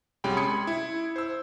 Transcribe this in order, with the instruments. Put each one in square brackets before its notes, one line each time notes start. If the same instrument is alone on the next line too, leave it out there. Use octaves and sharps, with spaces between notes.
[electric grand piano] C2 G#3 C#4 G4 G5 B5
B5 C6 D#6 G#6 C#7
E4
C5 E6